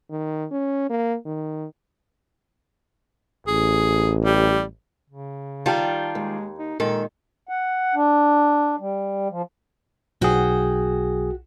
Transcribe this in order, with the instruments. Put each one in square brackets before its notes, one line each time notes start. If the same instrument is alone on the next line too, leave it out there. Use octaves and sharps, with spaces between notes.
[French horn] D#3
C#4
A#3
D#3
[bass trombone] A1 [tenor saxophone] G#4
[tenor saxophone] G3
[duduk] C#3
[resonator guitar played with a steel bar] D#3 G3 F4 [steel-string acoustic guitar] G5 A5
[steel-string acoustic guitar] D#2 [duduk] G#3
[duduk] D#4
[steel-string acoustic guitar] A#2 D#3 [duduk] G#3 [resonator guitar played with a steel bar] A4
[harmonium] F#5
D4
G3
F3
[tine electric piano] B1 G#4 [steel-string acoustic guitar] F#4 G5